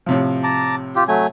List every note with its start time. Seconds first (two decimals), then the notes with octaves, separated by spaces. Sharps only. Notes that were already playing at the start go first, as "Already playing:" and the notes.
0.06 A2 C3 F3
0.44 A5 A#5 D6
0.96 F4 G4
1.08 F#3 A3 G#5